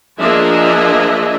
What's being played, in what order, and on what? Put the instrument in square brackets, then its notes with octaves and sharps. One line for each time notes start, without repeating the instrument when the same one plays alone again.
[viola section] F3 A#3 D4 G#4 D#5 E5